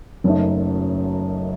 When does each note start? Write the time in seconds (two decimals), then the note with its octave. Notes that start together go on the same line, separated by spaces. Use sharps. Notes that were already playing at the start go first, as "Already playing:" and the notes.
0.24 F#1 F#2 F#3 A3 D#4